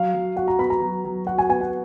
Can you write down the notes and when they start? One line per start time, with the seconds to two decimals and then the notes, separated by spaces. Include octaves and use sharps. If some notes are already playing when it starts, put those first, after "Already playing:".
Already playing: F#3 F5
0.14 F#3
0.37 F#4 F#5
0.48 A#5
0.58 B3 B5
0.70 A#5
0.81 F#3
1.05 F#3
1.27 F#4 F#5
1.38 G#5
1.49 B3 G#5
1.61 F#5